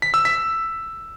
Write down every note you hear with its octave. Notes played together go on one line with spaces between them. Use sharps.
B6
E6
B6